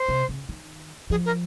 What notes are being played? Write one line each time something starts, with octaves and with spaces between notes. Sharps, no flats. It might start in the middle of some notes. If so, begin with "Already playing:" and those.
Already playing: C5
C3
C#3
D#3
F3 G#4
A#4